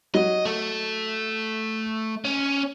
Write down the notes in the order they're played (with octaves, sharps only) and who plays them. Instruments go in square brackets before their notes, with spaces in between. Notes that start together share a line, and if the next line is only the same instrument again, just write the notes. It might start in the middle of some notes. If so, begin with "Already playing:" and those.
[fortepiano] F#3 [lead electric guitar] D#5
[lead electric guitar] A3 A4
C#4